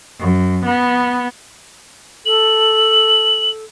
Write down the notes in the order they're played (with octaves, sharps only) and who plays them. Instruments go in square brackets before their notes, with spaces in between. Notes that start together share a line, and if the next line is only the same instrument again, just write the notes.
[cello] F#2
B3
[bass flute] A4 [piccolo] F#7